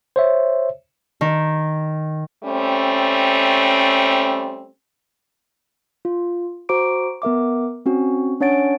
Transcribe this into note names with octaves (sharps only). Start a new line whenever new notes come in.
C5 C#5 E5
D#3
G3 A3 C4 C#4
F4
F#4 C5 A#5 D6 D7
B3 A#4 E5 D6
C4 C#4 F#4
C#4 D4 C#5 F#5 A6 D7